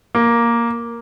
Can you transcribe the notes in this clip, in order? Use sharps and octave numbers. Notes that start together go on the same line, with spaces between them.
A#3